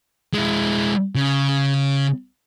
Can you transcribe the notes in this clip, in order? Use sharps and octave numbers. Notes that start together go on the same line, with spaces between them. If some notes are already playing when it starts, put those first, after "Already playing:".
G#3 E4
C#3